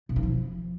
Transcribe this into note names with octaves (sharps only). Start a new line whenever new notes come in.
B2
D#3
F3